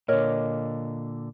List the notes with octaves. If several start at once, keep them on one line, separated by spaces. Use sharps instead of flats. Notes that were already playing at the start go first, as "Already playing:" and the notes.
A#2 D3 A#4 C#5 D#5